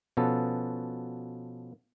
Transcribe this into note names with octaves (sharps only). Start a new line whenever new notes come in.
B2 F3 B3 C#4 A4